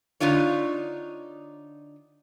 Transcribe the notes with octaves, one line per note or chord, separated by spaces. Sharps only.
D3 D4 D#4 F4 C#5